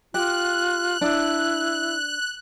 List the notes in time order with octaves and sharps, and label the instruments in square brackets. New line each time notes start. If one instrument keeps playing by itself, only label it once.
[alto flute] F4 [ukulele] G4 [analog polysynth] F#6
[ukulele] D4 [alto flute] E4